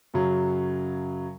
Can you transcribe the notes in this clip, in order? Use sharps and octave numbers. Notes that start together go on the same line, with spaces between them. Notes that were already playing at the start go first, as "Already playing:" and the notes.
F#2 C#3 F#3